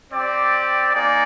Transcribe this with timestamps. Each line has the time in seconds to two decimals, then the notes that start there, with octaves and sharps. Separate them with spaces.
0.13 C4 G4 D5
0.94 A#3 D#4 G#4 D5